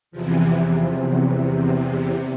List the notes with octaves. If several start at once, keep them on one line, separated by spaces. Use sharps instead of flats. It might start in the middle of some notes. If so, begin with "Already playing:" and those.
E2 C3 E3 F3
E3
F3
F#3